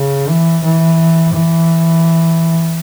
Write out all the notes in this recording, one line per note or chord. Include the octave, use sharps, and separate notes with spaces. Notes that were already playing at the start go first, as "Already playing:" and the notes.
Already playing: C#3
E3
E3
E3